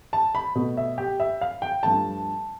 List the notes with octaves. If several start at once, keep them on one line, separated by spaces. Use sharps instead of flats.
A5
B5
B2 A3
E5
G4
E5
F5
G5
G2 F3 A3 A5